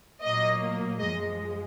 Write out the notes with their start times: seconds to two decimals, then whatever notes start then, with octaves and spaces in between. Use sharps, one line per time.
0.22 A#2 F#3 A#3 D#5
0.99 F#2 F3 G#3 D#5